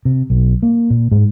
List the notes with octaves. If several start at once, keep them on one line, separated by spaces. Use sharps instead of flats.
C3
B1
A#3
A#2
G#2